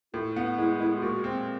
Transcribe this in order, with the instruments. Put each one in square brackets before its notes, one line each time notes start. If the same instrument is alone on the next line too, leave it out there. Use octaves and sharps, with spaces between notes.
[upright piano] A2 [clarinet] F4
[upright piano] B3
[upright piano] G#3 [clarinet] E4
[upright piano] G#3 [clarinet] E4
[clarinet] F4
[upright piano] A#2 [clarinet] F#4
[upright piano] C4